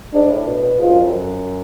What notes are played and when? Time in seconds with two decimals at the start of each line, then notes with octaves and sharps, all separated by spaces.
0.14 G#2 D4
0.25 G#2
0.29 A2
0.46 B2
0.63 B2
0.79 G#2 F4
0.90 F#2
0.99 F2
1.09 F#2